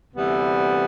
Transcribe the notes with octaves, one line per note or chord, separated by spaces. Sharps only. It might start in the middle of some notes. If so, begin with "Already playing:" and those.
D2 C3 E3 G3 B3